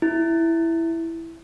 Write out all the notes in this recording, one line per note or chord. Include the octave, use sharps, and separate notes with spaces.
E4